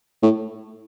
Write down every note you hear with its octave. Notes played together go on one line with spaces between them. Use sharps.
A2